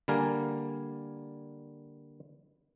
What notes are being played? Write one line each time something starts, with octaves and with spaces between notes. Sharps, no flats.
D3 G3 A#3 A#4 G#5